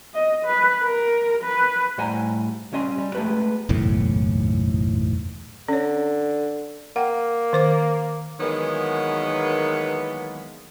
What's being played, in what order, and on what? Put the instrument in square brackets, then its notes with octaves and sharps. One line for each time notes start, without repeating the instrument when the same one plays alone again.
[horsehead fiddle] D#5
B4
A#4
B4
[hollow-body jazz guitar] A2 G3 C5 F#5 G#5 A#5
G3 C#4 D#5 C6
G3
G#3 A3 B3 G4 B4
[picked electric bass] F#1 B1 E2 A2
[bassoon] D3 [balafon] C#4 C#5
[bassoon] A#3 [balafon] F#5 G5
[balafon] D#3 C5 D6
[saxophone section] D#3 E3 F#3 G#3 A#3 B3